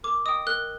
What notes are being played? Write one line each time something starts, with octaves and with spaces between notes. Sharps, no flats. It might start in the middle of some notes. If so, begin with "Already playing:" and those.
A#4 D6
D#5 G5 D#6
A#4 F#6